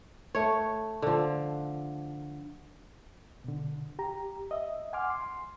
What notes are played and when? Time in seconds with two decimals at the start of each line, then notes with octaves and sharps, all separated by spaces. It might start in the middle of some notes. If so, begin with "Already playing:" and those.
0.35 A3 C#5
1.02 D3 F3
3.44 B2 D3
3.99 G4 A#5
4.51 D#5 E5
4.93 F#5 G#5 C6 D6 F6
5.10 C6